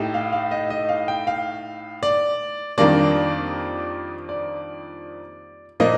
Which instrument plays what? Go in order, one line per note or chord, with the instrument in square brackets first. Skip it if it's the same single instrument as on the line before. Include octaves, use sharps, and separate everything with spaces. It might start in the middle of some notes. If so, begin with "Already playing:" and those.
Already playing: [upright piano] A2 A3 D#4 G4
[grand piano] F5
F5
D#5
D#5
F5
G5
F5
D5
[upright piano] F2 D#3 G3 A#3 D4 [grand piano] D5
[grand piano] D5
[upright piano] A#2 F3 A#3 [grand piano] D#5